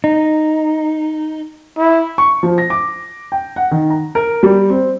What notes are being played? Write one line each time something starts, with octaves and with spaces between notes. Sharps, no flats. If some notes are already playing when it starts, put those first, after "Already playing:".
D#4
E4
C#6
F3
A#6
D6
G5
F#5
D#3
A#5
A#4
G3
C4